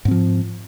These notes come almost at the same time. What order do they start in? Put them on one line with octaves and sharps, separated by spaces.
G#2 C4 F3